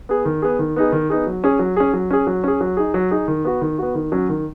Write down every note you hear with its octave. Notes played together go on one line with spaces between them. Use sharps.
B3 G#4
D#3
B3 G#4
D#3
B3 D#4 G#4
D#3
B3 D#4 G#4
F#3
C#4 G#4
F#3
C#4 G#4
F#3
C#4 G#4
F#3
C#4 G#4
F#3
D#4 G#4
F#3
D#4 G#4
D#3
B3 F#4
D#3
B3 F#4
D#3
F#3 C#4
D#3